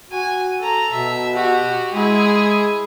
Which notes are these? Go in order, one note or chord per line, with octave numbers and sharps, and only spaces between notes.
F#4 G#5
A4 A#5
B2 E5
F#4 G4
G#3 E4 G#4